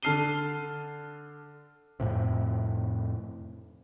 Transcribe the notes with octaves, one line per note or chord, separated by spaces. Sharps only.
D3 A5 F6 C7 D#7 G7
F2 A2 C3